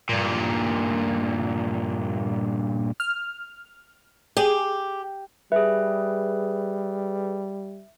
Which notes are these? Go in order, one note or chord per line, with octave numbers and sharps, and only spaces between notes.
G2 A#2
F6
G4 G#4
G3 G#4 B4 E5